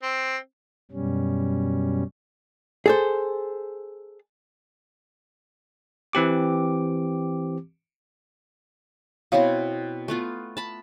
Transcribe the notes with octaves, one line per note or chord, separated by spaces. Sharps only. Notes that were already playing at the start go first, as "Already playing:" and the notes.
C4
F#2 B2 G3 C#4
G#4 A4 C5
E3 C4 G4 D6
B2 C4 E4 C#5 F5
A3 B3 F4
A5 B5